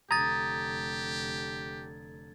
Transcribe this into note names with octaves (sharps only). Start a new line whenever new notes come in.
F1 D3 G4 A#5 D#6 G#6 A6